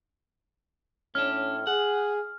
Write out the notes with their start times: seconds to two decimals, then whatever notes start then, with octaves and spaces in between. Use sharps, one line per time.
1.15 A2 C#4 D4 F6
1.67 G#4 F#5